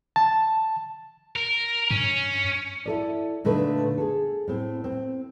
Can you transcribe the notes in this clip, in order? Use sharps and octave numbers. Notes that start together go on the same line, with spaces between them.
A5
A#4
G2 C#4
E4 A4 D5
A#2 D3 A3 D#4 B4
G#4 A4
A2 C4
C4